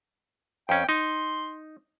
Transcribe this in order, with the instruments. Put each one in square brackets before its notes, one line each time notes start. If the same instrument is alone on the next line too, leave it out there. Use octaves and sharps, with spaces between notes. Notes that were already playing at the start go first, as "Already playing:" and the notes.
[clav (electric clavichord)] F2 C#4 [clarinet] G5
[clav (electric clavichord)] D#4 [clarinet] C6